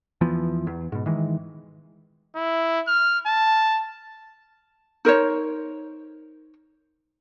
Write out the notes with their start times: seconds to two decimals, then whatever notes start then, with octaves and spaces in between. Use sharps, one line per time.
0.21 E2 E3 F3 B3
0.67 E2
0.92 G#2 B2
1.06 D#3 E3 G#3
2.36 E4
2.88 F6
3.27 A5
5.05 D#4 A#4 C5 C#5